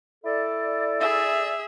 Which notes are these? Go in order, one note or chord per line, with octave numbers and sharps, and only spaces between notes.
E4 A4 D5
G#4 E5